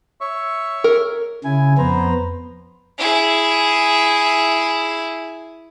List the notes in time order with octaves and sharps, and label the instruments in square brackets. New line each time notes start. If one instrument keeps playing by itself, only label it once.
[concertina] C#5 E5 C#6
[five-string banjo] A#4
[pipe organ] C#3 [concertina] E4 G#5
[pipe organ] F2 B3 [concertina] B4 C5 A#5
[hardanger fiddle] E4 G#4